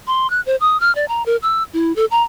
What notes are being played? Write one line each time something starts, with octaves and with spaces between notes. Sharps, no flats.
C6
F#6
C5
D#6
F6
D5
A#5
A#4
E6
E4
A4
A#5